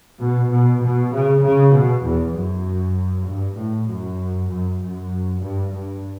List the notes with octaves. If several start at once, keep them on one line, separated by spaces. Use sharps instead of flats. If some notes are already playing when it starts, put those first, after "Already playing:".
B2
B2
B2
C#3
C#3
B2
E2
F#2
G2
A2
F#2
F#2
F#2
G2
G2